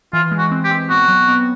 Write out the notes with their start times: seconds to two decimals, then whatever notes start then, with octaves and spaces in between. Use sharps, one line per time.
0.13 E3 F4
0.31 G#3
0.38 F#4
0.51 C4
0.64 G4
0.71 C4
0.89 B3 F#4
1.08 F#3
1.28 B3